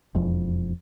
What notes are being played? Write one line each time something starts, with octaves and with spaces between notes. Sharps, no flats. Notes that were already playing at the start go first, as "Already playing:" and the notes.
E1 F2